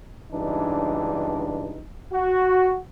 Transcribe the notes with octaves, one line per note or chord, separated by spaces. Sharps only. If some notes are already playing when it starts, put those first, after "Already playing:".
C#2 G2 E3 D4 D#4
F#4